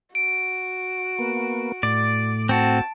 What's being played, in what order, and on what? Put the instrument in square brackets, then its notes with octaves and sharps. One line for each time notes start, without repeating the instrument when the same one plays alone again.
[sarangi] F#4 [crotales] D7
[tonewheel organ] A#3 B3
[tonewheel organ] A2 [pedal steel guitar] D5
[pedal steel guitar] C4 F#4 [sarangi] A5